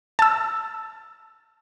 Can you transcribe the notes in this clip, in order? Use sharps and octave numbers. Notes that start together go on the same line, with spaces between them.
A5 E6